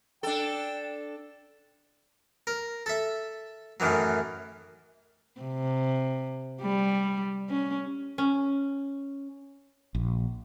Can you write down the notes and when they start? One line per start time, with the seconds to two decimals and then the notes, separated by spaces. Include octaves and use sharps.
0.23 D4 A4 G5
2.47 A#4
2.86 A4 E5
3.80 F#2 A2 D#3 E3 F#3
5.41 C3
6.61 G3
7.50 C#4
8.18 C#4
9.95 A#1